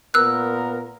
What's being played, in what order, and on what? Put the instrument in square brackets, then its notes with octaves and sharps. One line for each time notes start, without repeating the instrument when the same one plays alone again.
[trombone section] A#2 B3 A#4 [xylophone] E6 F#6